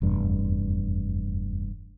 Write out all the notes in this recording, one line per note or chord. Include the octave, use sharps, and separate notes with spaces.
F1 E2 G2